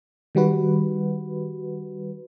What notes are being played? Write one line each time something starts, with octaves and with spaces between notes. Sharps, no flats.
D#3 G3 F#4 B4